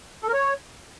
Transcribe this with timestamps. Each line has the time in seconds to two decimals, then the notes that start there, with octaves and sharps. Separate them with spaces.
0.23 A4
0.28 A#4
0.34 C#5